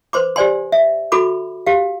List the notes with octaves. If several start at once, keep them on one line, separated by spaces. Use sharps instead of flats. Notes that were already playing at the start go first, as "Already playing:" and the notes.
B4 C5 C6 D6
G4 C5 D5 G#5 C6
E5
F#4 A4 B5 D6
G4 F5